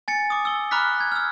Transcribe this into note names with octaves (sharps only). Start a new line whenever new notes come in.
G#5 A6 C#7
D6 D#6
E6 G7
A#5 B5 D6 F6 F#6 B6
G#6
E6 F6